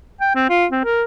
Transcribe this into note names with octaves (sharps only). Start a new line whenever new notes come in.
G5
C4
F4
C4
A#4